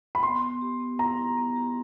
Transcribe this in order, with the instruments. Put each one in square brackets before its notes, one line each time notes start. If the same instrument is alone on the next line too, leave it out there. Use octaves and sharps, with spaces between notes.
[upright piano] B5
[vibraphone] B3 [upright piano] C6
[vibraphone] B3
G4
B3
[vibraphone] E4 [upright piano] A#5
[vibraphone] E4
B3
G4